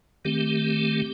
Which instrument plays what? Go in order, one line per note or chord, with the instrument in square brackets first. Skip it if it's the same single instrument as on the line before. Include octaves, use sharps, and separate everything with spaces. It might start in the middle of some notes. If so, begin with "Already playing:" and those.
[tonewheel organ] D#3 A3 C4 G4